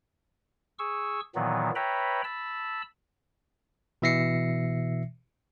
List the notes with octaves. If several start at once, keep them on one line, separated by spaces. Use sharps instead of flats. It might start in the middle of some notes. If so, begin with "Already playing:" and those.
G#4 C#6 E6
A#2 D#3 E3 F#3 B3
B4 C#5 E5 G5 A#5 B5
A5 B5 E6
B2 E3 E5 A#6 C7 C#7